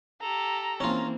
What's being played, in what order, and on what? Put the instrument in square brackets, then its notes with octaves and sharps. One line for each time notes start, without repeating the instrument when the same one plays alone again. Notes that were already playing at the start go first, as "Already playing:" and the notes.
[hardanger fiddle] G4 A4 [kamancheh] A#5
[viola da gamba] E3 A#3 C4 [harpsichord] C#4 F4